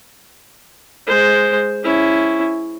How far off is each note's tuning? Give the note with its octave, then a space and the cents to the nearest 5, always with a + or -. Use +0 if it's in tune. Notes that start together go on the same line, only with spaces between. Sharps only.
G#3 +0 C5 +0
C#4 +5 E4 +0